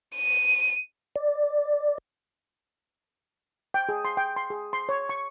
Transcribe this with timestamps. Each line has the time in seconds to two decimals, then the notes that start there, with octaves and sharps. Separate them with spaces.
0.16 D#7
1.16 D5
3.74 G5
3.89 G#4
4.05 C6
4.17 G5
4.36 C6
4.50 G#4
4.73 C6
4.89 C#5
5.09 C#6